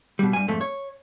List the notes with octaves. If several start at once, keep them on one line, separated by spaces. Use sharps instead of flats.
B2 G3
G2 G#5
F2 G#2 A3
C#5